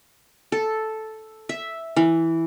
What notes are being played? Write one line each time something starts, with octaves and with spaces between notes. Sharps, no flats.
A4
E5
E3